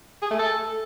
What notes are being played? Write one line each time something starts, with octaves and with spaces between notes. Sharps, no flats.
G#4
A3
A4